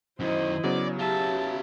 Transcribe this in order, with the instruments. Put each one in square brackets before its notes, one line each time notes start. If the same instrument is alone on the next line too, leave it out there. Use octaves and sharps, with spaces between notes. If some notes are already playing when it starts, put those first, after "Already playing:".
[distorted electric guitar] F#2 D#3 [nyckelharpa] E4 [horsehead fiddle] C5 D#5
[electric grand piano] C#3 F#3 B3 [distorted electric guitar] D5
[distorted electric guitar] F4 E5 [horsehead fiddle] G4 [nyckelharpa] A5